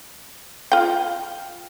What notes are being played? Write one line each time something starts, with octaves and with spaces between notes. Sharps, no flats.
F4 G5